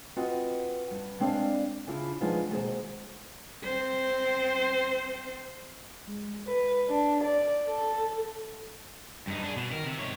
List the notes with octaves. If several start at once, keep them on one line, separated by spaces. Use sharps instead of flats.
C4 F4 F#4 B4 D#5 F#5
G2
G#3 C4 D4 D5 E5 F5
C#3 D4 E4 F4
F3 G#3 B3 D4 D#4 F4
D#2 B2 G#3 A4 C5 A#5
C4 C5
G#3
B4
D4
D5
A4
G2 D#4
D4 G#4
B2
D#3 A#4
C3
G#2 C#5